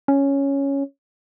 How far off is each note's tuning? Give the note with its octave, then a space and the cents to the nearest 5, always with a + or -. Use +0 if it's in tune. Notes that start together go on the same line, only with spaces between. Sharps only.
C#4 +0